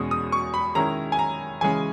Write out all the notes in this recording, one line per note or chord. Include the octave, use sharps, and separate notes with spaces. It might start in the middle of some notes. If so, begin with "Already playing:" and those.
Already playing: E2 B2 G#3 C#4 D#6
D#6
C#6
B5
D#3 G#3 C#4 E4 A#5
G#5
A#5
C#3 E3 G#3 C#4 G#5